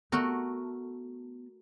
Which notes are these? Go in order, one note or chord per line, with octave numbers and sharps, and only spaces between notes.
A3 B3 F#4 A#4